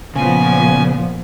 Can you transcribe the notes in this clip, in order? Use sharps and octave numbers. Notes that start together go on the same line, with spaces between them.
A#2 C#3 F3 B3 G#5